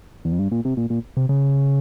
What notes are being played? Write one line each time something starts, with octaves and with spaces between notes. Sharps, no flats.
E2
F2
G2
A#2
C3
A#2
A#2
C3
C#3